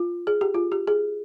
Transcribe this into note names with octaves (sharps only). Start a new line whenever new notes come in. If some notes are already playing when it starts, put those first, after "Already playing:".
Already playing: F4
G#4
G4
F4
G4
G#4